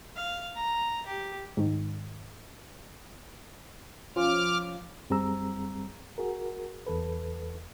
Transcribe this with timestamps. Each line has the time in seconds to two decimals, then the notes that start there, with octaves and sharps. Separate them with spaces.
0.16 F5
0.56 A#5
1.06 G4
1.57 G#2 D#3
4.16 F3 C#4 F4 D6 F6
5.10 F#2 G3 C4 G#4 A#5 E6
6.18 F#4 G#4 A#4
6.87 E2 A4 B4